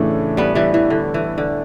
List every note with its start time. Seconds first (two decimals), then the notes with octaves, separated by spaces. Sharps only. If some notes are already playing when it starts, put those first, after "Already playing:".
Already playing: A2 C#3 E3 A3 D4
0.37 G3 B3
0.55 E3 G3
0.74 E3
0.90 D3
1.14 E3
1.38 D3